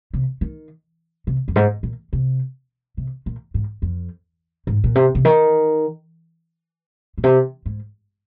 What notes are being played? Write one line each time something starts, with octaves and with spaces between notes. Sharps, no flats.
C3
D#3
C3
F2
G#2
A#2
C3
C3
A#2
G#2
F2
G#2
A#2
C3
C3
D#3
A#2
C3
G#2